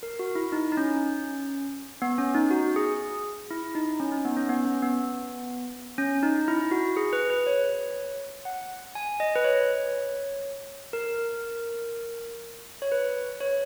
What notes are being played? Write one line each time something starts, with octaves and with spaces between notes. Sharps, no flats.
A#4
F#4
E4
D#4
D#4
C#4
B3
C#4
D#4
F#4
G#4
E4
D#4
C#4
D#4
B3
C#4
B3
C#4
B3
C#4
D#4
E4
F#4
G#4
B4
B4
C#5
F#5
G#5
D#5
B4
C#5
A#4
C#5
B4
C#5